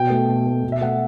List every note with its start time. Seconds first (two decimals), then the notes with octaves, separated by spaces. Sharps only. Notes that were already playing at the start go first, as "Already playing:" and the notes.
Already playing: B2 G5
0.10 A3
0.28 B2
0.46 A3
0.63 B2
0.72 E5
0.81 A3 F#5